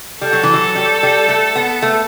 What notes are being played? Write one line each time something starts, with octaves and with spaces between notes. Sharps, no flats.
G3 A4
F#3
E3
F#3
G3
G3
A3
B3
A3